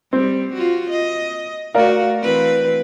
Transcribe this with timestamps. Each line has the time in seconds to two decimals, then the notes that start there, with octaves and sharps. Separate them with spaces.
0.13 G3 C4
0.53 F4 F#4
0.90 D#5
1.74 A3 F#4 A#4 D5 F5
2.23 E3 C4 B4